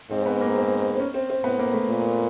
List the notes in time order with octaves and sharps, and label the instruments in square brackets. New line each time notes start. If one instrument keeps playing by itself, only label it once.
[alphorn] G#2 [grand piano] C4
[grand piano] C4
B3
A#3
C4
C4
C#4
C4
C4
[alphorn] A2 [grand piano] B3
[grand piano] A#3
A3
[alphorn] A#2